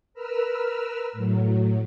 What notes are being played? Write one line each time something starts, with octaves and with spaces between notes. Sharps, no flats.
A#4 B4 E6 F6
A2 F#3